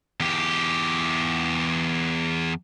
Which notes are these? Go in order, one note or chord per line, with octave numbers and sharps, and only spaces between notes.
E2 G4